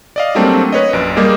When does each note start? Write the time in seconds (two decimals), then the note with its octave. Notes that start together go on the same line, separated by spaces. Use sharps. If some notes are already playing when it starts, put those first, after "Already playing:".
0.16 D5 D#5 F5
0.35 F#3 G3 A3 A#3 C4 D4
0.72 B4 C#5 D#5
0.93 A#1 F#2 D7
1.16 G3 A#3 G4 G#4 A#4 D#5